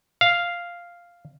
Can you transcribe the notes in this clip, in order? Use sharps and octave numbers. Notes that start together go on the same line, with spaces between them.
F5